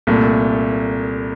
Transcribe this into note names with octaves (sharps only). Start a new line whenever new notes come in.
C2 A#2 A3